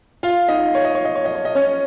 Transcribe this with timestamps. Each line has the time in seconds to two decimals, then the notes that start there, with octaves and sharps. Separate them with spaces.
0.23 F4 F5
0.48 D#4 D#5
0.75 C#5
0.85 D#5
0.95 C#5
1.05 D#5
1.15 C#5
1.25 D#5
1.35 C#5
1.45 D#5
1.55 C#4 C#5